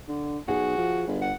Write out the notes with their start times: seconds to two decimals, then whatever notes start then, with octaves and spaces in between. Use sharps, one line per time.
0.08 D3
0.48 B1 F#4 G#4
0.78 F3
1.07 G1
1.22 F#5